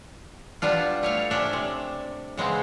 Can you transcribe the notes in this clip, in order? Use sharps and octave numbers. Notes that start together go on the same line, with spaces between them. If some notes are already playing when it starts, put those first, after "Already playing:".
G3 B3 D4 F4
A3 C#5 F5
C3 C#4 D4 E5
C3
C#3 G#3 B3 C4